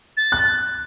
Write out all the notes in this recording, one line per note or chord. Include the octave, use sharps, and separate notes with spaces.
A6
F#6